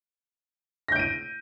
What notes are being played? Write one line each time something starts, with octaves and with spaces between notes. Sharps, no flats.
G6 A#6 D7 D#7